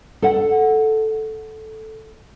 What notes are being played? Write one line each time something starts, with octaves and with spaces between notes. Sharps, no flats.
A4 F#5